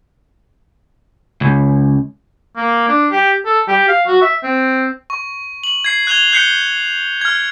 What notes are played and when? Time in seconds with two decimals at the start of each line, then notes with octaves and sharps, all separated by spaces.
1.41 C#2
2.57 A#3
2.88 D4
3.12 G4
3.46 A4
3.68 G4
3.88 F5
4.07 F#4
4.22 E5
4.44 C4
5.10 C#6
5.64 F#7
5.84 G#6 C7
6.07 F#6 G#6 F7 G7
6.32 F#6 G6 C7 C#7 G7
7.21 F6 G#6